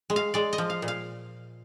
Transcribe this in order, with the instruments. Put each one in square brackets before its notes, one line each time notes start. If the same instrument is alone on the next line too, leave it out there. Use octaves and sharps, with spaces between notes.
[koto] G#3
F5
G#3 D5
D#5
F3
F5
A#2
F5